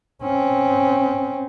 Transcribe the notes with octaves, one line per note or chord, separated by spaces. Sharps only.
C4 C#4